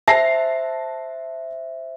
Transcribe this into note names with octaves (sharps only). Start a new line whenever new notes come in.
C5 E5 A5 A#6 C7